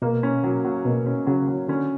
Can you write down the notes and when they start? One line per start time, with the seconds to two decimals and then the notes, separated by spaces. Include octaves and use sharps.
0.02 B2 A#3
0.23 C#4
0.44 F#3
0.65 F#3
0.85 B2 A#3
1.06 C#4
1.27 C#3 F#3
1.48 F#3
1.68 D3 C#4